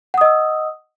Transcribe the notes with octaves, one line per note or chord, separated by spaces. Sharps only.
D#5 F#5 D#6 E6